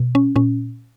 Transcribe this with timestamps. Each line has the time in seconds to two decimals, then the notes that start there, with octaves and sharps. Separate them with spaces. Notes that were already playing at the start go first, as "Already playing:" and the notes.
Already playing: B2
0.15 C#4
0.36 A#2 C#4